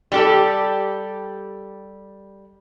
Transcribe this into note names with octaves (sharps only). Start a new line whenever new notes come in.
G3 G4 A4